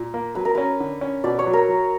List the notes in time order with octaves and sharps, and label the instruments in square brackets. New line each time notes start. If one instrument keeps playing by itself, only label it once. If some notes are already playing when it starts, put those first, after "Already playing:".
Already playing: [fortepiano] A#2
A#3
[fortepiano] F#3 [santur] B4
[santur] A#4
[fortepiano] C#4 [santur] B4
[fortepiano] D3
C#4
[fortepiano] B2 [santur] D5
[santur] C#5
[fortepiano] F#3
[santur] A#4
[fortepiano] F#3